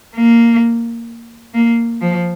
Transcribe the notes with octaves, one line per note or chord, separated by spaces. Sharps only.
A#3
A#3
F3